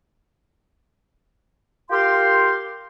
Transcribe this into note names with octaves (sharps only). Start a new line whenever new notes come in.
F4 G4 A#4 F5 G5 C6